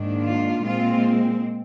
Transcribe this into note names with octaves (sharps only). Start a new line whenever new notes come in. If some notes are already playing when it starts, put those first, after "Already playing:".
Already playing: G#2 D#3 A#3 D4
F4
A#2 G#3 C4 F4